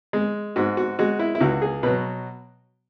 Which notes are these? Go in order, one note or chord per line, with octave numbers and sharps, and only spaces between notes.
G#3
G#2 F#4
F#4
G#3 F#4
E4
E4
C#2 F#4
G#4
B2 F#3 B4